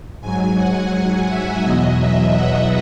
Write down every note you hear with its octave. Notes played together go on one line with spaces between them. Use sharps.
G#2 F#3 G#5
F#5
F#5
E5
E2 B2 F#3 D#5
E5
F#5